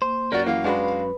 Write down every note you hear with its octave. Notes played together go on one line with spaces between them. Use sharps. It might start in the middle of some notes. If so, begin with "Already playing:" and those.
A#3 C5
F#2 F#3 F#4 A#4 D5
E3 A#3 F5 F#5
G#3 D4 F#4 B4 B5